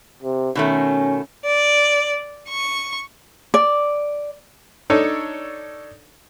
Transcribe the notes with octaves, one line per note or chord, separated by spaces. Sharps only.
C3
B2 D#3 A3 C#4
D5
C#6
D5
D4 D#4 A4 C#5